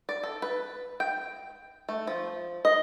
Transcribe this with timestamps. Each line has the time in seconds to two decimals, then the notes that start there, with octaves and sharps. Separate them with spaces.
0.09 D5
0.23 A4
0.42 B4
1.00 G5
1.89 A3
2.07 F3
2.65 D#5